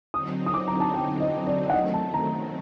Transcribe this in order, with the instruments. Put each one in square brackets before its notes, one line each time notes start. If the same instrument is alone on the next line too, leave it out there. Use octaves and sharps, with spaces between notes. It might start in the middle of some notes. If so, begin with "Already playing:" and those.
[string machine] D3 F#3 C4 D#4 [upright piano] D#6
[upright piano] D#6
D6
A#5
A5
G5
D#5
D5
F#5
[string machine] D#3 F#3 A3 C4 [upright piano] D#5
[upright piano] A5
A#5